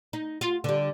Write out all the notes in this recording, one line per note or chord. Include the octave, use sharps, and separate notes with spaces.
D#4
F4
D3 G3